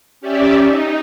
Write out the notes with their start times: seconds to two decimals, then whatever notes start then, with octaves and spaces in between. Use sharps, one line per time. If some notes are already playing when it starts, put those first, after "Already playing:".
0.21 C#4 G4 D5 E5
0.65 D#4